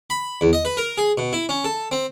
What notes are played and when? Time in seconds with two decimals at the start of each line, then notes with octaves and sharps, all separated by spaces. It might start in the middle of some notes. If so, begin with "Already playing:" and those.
0.10 B5
0.41 E2
0.53 D#5
0.65 B4
0.77 A#4
0.98 G#4
1.18 B2
1.33 E4
1.49 C#4
1.64 A4
1.91 C4